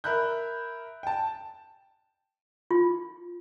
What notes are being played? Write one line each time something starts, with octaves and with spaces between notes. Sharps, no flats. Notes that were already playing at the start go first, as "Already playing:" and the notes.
A#4 E5 B5 F#6 G6
G5 A5
F4